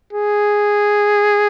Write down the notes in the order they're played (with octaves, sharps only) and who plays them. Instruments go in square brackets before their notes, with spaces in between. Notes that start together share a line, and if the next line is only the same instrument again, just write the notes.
[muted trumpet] G#4